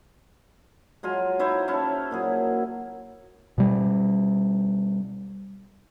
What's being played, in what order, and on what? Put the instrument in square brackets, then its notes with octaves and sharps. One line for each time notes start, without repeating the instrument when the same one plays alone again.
[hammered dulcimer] F#3 G#3 F4 G#5
D#4 E4 C5 C#5
C#4 E4 A5
A#2 F#3 G#4
[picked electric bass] B2 G3